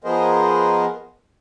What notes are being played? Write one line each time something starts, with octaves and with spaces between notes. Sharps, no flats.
F3 B3 G#4 A#4 C5 D#5